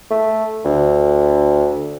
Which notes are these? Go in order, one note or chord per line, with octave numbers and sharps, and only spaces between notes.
A3
D2